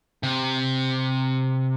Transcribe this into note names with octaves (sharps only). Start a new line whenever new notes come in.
C3